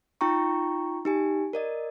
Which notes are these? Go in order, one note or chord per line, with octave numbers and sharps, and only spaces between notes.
D#4 F4 G5 A#5 C#6
D#4 G4 G#5
A#4 D5 D#5